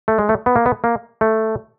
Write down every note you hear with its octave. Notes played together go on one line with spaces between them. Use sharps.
A3
G#3
A3
B3
A#3
B3
A#3
A3